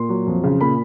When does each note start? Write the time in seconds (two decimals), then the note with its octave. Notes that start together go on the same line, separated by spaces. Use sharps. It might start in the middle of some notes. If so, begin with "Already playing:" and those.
Already playing: A#2 C6
0.09 F#3
0.27 F2
0.44 C#3
0.61 A#2 B5